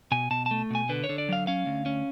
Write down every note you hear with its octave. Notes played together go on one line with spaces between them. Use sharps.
B2 G#5
B2 A5
A3 A5
B2 G#5
D3 B4
C#5
D3
D5
F#3 F5
C#4 F5
D2
C#4